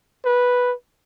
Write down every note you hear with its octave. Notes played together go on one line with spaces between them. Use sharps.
B4